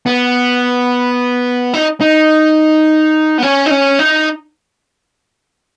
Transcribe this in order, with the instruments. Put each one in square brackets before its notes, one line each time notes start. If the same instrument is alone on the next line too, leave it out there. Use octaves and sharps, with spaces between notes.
[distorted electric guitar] B3
D#4
D#4
B3
C#4
D#4
C#4
D#4